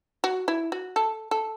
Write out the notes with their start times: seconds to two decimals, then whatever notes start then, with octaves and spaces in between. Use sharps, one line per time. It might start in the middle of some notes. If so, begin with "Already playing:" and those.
0.24 F#4
0.48 E4
0.72 F#4
0.96 A4
1.31 A4